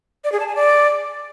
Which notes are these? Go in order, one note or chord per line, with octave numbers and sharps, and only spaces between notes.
D5
G#4
A5
G#5
D5